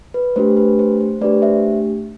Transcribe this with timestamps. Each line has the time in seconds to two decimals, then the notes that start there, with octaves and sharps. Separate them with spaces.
0.14 B4
0.36 A3 D4 G4 C5
0.57 B4
0.79 C5
1.01 C5
1.21 A3 D4 G4 B4 D5
1.42 C5 E5